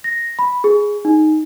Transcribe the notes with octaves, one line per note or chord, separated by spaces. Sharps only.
A#6
B5
G#4
D#4